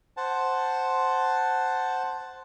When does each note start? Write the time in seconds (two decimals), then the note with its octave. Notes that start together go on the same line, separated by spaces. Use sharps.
0.17 C5 F#5 A5